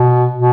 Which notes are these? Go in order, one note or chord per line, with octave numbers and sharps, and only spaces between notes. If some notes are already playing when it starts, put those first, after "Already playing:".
Already playing: B2
B2